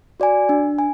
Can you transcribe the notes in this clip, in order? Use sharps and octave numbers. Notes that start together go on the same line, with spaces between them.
F#4 D5 G#5
D4
G#5